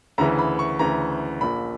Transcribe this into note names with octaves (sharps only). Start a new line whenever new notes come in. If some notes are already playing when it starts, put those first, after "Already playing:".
D2 C#3 E3 A#5
B5
C#6
D2 C#3 E3 A#5
A#1 A#2 B5